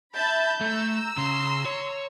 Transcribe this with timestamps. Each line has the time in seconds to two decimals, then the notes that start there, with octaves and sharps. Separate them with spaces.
0.15 E5 A5 B5 G6
0.61 A3 A#5 E6
1.17 C#3 C6
1.66 C#5